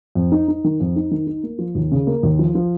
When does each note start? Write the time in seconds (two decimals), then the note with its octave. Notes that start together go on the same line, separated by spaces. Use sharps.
0.15 F2
0.32 D#4
0.48 D#4
0.64 D#3
0.80 F2
0.96 D#4
1.11 D#3
1.27 D#4
1.43 A#3
1.59 F3
1.75 D#2
1.92 C#3
2.07 A#3
2.23 D#2
2.39 F3
2.55 F3